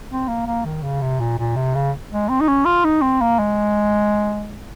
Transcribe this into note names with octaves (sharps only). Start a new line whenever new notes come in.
C4
A#3
A#3
D#3
C#3
C3
A#2
A#2
C3
C#3
G#3
C4
D#4
C#4
F4
D#4
C4
A#3
G#3